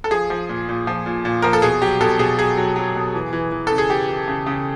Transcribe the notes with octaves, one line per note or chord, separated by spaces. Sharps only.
A4
F3 G#4
F3
A#2
A#2
F3
A#2
A#2
F3 A#4
A4
B2 G#4
F#3 G4
B2 A4
B2 G#4
F#3 G#4
F#3
F#3
B2
E3
E3
E3
C#3 A4
G#4
E3 G4
E3
C#3
C#3